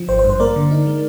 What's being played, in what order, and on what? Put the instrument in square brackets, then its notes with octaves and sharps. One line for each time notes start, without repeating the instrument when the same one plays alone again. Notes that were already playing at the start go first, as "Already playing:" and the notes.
Already playing: [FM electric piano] F3
G#1 C5
C5
G2
C5
A#3 A#4 D5
D3
D#4
G#3